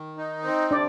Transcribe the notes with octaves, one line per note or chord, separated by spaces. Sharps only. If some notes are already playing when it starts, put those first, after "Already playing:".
Already playing: D#3
D#4
C4
C3 D4 D5